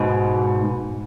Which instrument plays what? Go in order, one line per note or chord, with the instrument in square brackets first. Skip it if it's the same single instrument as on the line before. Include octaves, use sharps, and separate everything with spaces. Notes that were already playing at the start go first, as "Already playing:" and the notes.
Already playing: [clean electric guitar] G#2 B2